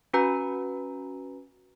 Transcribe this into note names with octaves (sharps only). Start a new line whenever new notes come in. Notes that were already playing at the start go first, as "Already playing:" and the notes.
C#4 F#4 B4 G#5 A#5